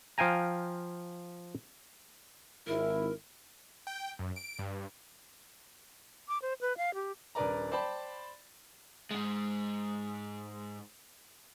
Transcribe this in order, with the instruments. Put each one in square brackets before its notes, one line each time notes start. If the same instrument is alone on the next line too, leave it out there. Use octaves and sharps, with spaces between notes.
[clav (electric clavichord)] F3 F5 G5 G#5 A#5
[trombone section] G#1 E4 [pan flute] A#4
[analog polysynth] G5
F#2
D7
G2
[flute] D6
C5
B4
F5
G4
[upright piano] D#1 D4 A#4 B4 D5 A#5
C5 D5 G5 A5 B5
[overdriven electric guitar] G#2 G#3